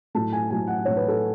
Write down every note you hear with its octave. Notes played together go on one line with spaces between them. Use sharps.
A2 F#3 A3 A5
G#5
A2 F#3 A3 G#5
F#5
A2 F#3 A3 C#5
B4
A4